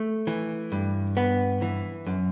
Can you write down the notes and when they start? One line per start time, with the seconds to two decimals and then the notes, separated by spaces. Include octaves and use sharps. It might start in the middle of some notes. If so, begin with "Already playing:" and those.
Already playing: A3
0.27 E3
0.72 G2
1.17 B3
1.62 E3
2.06 F#2